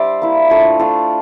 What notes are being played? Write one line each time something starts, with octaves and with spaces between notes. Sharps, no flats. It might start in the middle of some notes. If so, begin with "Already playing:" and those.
Already playing: G3 D4 C5 D5 E5
A#3 E4
A3 D4 F4
A3 D4 F4